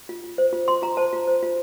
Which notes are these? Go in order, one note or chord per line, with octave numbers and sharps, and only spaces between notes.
F4
F4
C5
F4
F4 C6
F4 A#5
C5 A5
F4
C5
F4